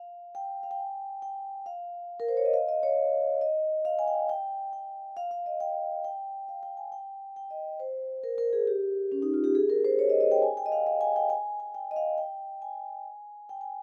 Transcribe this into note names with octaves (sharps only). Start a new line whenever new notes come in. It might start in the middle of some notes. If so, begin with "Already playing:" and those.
Already playing: F5
G5
F5
G5
G#5
G5
F5
A#4
C5
C#5
D#5
F5
D#5
C#5
D#5
F5
G#5
G5
G5
G5
F5
F5
D#5
G5
G5
F5
G5
G#5
G5
G5
D#5
C5
A#4
A#4
G#4
G4
C#4
D#4
F4
G4
G#4
A#4
C5
C#5
D#5
D#5
G5
G#5
G5
D#5
F5
F5
G#5
G5
G#5
G#5
G5
D#5
F5
G5
G#5
G5
G#5